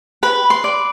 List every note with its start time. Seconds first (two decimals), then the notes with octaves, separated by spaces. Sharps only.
0.23 B4 B5
0.50 C6
0.64 D5